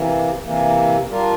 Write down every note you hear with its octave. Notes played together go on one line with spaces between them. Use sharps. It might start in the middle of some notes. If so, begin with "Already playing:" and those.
Already playing: C3 E3 A#3
C3 E3 A#3
G3 D4 F4 A#4